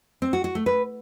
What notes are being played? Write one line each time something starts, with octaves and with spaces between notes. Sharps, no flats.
C4
F#4
F#4
A3
B4